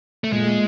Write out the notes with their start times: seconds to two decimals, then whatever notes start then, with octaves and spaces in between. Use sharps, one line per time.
0.24 A3
0.32 A#2 G#3